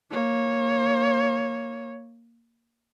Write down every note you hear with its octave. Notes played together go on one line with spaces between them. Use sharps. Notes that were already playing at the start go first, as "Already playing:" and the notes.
A#3 C#5